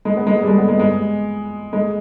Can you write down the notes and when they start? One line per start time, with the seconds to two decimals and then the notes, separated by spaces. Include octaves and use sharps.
0.05 G#3
0.17 B3
0.27 G#3
0.42 G3
0.48 G#3
0.58 B3
0.68 G#3
0.79 G#3
1.73 G#3